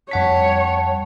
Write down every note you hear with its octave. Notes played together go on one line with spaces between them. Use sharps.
F2 G3 C#5 F#5 A5 B6